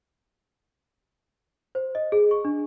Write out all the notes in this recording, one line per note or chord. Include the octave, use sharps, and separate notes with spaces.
C5
D#5
G#4
C#6
D4